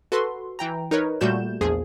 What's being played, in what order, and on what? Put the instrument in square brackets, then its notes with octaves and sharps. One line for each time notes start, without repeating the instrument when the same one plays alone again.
[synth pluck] F#4 A4 B4 C6
E3 G5 A#5
D#4 A#4 B4 C#5
A#2 G3 A3 F#4 G6 E7
A#1 E2 F3 G#4